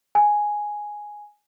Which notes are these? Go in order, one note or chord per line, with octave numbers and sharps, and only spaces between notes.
G#5